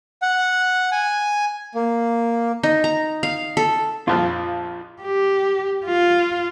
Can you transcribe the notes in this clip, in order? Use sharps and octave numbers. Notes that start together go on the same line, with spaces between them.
F#5
G#5
A#3
D#4
A#5
F5
A4
A#1 F2 F3 F4
G4
F4